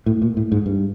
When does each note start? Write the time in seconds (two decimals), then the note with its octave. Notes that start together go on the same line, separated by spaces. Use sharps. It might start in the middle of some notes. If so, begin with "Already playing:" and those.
0.06 A2
0.22 A#2
0.37 A2
0.52 G#2
0.66 G2